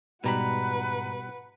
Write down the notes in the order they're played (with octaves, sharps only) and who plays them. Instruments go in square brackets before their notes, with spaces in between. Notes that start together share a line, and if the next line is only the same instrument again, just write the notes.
[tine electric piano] G#2 A#5 B5 [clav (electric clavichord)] B2 G3 [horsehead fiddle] B4 F#5